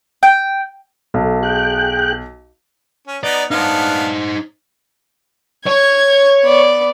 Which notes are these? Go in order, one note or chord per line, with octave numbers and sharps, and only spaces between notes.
G5
B1 A4
G#4 G5 F#6
C#4
B3 D#4 D5
B3 D4 D#4 C5 F5
C#5 G#6
B3 D5